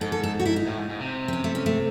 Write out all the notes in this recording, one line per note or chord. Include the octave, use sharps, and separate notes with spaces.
G#2 A4
A4
A4
F#4
E4
D#4
A2
G#2
G#2
C3
C4
C#4
A3
C#4
A3